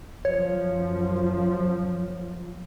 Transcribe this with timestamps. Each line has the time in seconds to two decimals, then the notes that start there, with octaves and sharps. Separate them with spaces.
0.25 F#2 F3 C#5